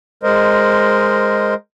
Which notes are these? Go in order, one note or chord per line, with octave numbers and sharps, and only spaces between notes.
G#3 A#4 C5 D#5